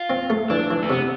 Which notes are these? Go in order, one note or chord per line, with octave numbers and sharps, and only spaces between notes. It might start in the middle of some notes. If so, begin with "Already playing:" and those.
Already playing: F4
C4
A3
E3 D4
E3
A3
C3 B3